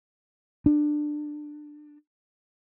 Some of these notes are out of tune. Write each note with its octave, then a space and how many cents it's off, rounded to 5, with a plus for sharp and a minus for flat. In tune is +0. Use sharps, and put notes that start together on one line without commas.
D4 +20